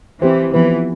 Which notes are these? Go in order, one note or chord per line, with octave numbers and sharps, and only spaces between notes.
E3 C4 G4 C5
E3 F3 B3 F4 B4